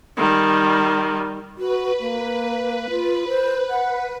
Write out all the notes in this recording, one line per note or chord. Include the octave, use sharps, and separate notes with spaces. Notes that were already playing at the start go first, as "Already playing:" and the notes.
D#3 G3
F#4 B4
A#3
F4
C5
F#5